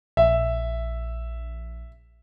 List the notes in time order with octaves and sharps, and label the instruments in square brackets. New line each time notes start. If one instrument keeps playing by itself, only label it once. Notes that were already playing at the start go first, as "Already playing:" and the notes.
[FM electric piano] A#1 [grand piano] E5